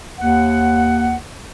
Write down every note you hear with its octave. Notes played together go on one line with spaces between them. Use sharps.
D#2 F#5